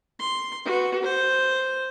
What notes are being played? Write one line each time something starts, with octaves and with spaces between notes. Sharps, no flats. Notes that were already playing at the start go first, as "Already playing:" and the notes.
C6
F#4 B4
C5